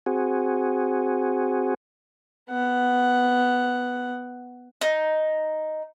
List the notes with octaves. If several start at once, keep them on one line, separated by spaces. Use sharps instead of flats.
C4 F#4 G#4
B3 F#5
D#4